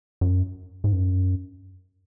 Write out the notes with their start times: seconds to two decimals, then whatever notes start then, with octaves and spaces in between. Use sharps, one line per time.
0.21 F#2
0.84 G#2
0.92 F#2